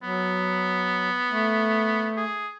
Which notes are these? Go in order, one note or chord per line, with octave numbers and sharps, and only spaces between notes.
F#3 B3
A3
G#4